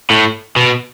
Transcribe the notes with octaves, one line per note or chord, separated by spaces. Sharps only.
A2
B2